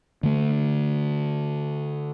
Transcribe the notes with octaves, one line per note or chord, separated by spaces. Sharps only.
D3 A3